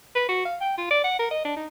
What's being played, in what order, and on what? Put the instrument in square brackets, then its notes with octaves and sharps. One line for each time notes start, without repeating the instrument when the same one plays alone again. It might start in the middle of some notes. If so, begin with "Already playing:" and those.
[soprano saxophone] B4
F#4
F5
G5
F4
D5
F#5
A#4
D#5
D4
D#4